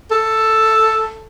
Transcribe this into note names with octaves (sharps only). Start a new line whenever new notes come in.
A4